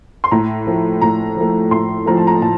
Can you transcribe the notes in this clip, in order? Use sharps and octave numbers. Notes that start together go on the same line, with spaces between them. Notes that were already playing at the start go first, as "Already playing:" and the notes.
C6
A2 A#5
F3 A3
A2 A#5
F3 A3
A2 C6
F3 A3 A#5
A5
A#5
A2 A5